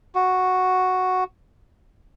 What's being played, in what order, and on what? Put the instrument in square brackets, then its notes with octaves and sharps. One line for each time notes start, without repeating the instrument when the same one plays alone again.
[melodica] F#4